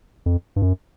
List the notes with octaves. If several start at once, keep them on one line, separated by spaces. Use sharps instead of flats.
F2
G2
F#2